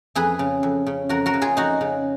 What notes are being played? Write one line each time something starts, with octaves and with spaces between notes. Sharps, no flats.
F2 G#4 B4
C#3
F2
C#3
F2 F#4 A#4
F#4 A#4
C#3
F4 G#4
F2 D#4 F#4
C#3